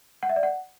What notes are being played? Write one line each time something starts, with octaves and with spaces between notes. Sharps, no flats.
F#5
E5
D5
F#5